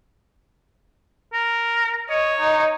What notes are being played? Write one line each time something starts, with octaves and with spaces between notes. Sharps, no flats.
A#4
C#5 D#5
D#4